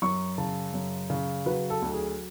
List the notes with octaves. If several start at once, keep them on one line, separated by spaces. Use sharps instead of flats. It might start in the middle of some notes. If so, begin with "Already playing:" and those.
F#2 C#6
C#3 A5
F#2
C#3
F#3 B4
A4
D2
G#4